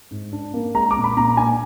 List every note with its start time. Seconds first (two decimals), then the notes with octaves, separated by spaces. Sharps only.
0.11 G#2
0.32 D4
0.54 A#3
0.74 G#3 A#5
0.91 D6
0.96 A#2
1.04 B5
1.17 A#2 A#5
1.37 D4 G#5